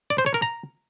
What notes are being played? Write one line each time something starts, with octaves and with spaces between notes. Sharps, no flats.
D5
C5
C#5
A#4
A#5